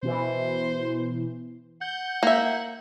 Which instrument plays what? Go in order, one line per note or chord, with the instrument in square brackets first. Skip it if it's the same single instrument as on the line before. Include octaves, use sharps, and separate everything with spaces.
[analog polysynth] B2 E3 [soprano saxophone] C5
[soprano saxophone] F#5 [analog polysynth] G6
[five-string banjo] A#3 E5